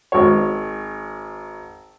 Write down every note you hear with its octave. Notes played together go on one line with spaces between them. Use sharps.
G#1 C#5